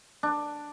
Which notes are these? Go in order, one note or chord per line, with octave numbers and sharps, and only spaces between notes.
D4